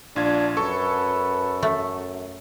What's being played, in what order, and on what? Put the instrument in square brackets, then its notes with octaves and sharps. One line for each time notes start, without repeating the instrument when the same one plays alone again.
[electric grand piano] A#1 F4 G#6 [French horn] D4
[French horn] F#2 [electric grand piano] A4 C#6 [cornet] B4
[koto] A3